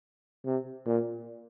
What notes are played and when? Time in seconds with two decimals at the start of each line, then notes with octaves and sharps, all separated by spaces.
0.45 C3
0.86 A#2